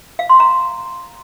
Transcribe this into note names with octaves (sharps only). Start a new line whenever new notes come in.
F5
C6
A#5